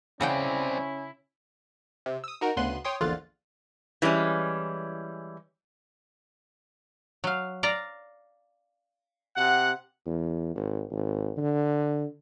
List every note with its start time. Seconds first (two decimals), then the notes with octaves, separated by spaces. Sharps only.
0.21 C#3 C4 C#4 E4 D5 F#5 G5
2.06 C3
2.24 D#6 E6
2.41 D#4 F#4 A#4
2.57 D2 C#3 B3 C6 F#6 D#7
2.85 C#5 G5 C6 D#6
3.01 A#1 E2 D3 F4 F#6 A6
4.02 E3 G3 G#3 C#4
7.24 F#3 F5
7.63 D5 F5 A#5
9.37 C3 F#5
10.06 E2
10.55 G#1
10.91 G#1
11.37 D3